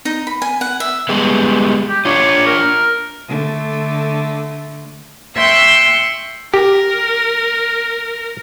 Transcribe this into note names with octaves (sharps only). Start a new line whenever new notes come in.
D#4
B5
G#5
F#5
E5
G3 G#3 B3
G4
D4 F4 C#5
A#4
D3 A3
E5 G5 C6 C#6 E6 F#6
G4 A#4